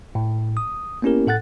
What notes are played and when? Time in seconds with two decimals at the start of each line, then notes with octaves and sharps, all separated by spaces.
0.15 A2
0.57 D#6
1.02 A#3 B3 C#4 E4 G4 A#4
1.27 A2 A4 F#5 F#6 A6